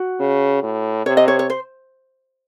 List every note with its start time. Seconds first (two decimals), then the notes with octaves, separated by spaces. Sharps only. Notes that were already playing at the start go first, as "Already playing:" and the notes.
Already playing: F#4
0.20 C#3
0.63 A2
1.06 C3 C#5
1.17 D#5
1.28 C#5
1.39 C#5
1.50 C5